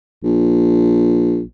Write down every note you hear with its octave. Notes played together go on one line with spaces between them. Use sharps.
A#1